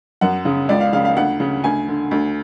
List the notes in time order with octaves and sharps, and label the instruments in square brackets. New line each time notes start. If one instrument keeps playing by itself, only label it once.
[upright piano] F#2 F#5
C#3
C#2 D5
F5
C#3 F5
F5
D2 F#5
C#3
D2 G#5
D3
D2